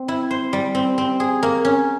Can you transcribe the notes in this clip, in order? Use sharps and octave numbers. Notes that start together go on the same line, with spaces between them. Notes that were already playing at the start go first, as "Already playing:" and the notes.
Already playing: C4
E4
C5
G3
C4
C4
G#4
A#3
C#4